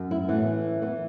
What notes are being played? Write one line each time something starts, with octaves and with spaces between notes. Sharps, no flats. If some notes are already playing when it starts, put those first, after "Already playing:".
Already playing: F#2
E4
A2 E3 B3
E3 B3